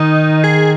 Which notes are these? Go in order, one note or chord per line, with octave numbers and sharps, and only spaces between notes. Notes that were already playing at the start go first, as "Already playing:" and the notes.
Already playing: D#3 D#4
G#4